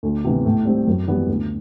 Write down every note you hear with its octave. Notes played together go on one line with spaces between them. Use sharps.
D2
C3 E3 B3
A2
G3 C4
F#2
E3 G3 B3
D2